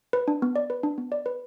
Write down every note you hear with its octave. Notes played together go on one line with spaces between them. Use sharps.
B4
D4
B3
D5
B4
D4
B3
D5
B4